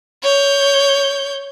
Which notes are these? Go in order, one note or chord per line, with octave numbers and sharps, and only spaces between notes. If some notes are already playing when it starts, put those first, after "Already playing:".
C#5 G6